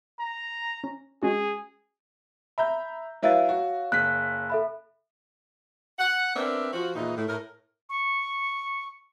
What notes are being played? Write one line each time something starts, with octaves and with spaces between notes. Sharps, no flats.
A#5
C#4
G#3 C#4 F#4 G#4
E5 A#5 B5 G6
F#3 E4 B4 C#5 F5 A6
F#4
F#1 F#6 B6
A4 E5 B5
F#5
B3 C4 D4 A#4 D5 E5
F3 F#4
E2 A#2 E3 D#4
A2
A2 A#4
C#6